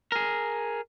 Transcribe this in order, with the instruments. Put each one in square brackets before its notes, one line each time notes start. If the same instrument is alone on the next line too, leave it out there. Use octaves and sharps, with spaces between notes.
[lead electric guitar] G#4 A#4